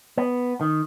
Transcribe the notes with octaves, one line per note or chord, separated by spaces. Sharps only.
B3
D#3